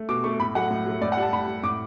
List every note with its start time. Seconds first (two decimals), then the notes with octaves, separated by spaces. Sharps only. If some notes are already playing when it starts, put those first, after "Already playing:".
Already playing: A3
0.09 B2 D6
0.24 A3 C#6
0.40 A2 B5
0.55 F#3 A3 F#5
0.71 A2
0.86 F#3 A3
1.01 A2 D5
1.12 F#5
1.17 G3
1.22 A5
1.33 A2 B5
1.48 G3
1.64 A2 D6